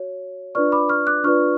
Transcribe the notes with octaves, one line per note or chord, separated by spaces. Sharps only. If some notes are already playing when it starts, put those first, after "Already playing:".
Already playing: F#4 C#5
D4 F4 B4 D5 C#6 F6
B5 D6
C#6 F6
D6 F#6
D4 F4 B4 D5 C#6 F6